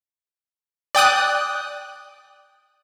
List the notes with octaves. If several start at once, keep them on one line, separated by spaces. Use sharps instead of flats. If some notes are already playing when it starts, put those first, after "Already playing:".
D5 G5 D#6 F#6